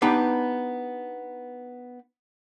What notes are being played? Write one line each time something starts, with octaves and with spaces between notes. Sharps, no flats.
B3 D4 D#4 G4 B4